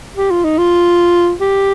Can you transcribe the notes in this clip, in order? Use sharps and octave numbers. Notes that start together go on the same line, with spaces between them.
G4
F4
D#4
F4
G4